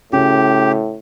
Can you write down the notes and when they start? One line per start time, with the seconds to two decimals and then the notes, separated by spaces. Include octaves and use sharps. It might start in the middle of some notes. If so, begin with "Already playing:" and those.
0.13 A2 C#3 C#4 F#4 G4